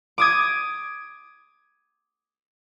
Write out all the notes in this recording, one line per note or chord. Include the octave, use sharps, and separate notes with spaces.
D6 D#6 G#6